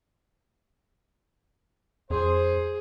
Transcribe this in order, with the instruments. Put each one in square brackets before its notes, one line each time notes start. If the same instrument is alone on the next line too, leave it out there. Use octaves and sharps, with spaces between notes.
[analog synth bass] F2 [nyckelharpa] G#4 [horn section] C5